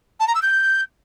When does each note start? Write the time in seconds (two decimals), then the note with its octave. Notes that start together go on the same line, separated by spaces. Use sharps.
0.20 A5
0.27 A#5
0.35 E6
0.42 G6